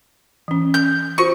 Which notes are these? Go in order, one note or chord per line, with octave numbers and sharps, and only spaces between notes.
E3 C#4
G6
F4 F#4 C5 C#6